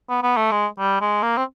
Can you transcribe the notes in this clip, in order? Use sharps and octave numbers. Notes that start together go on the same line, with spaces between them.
B3
B3
A3
G#3
G3
G#3
A#3
C4